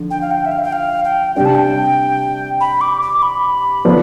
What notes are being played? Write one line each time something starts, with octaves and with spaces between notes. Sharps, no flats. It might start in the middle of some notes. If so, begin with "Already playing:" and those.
Already playing: D3 F3
G5
F5
G5
E5
F5
G5
F5
G5
C3 G3 D4 G4 G5
A5
G5
B5
D6
D6
B5
D3 F3 B3 D4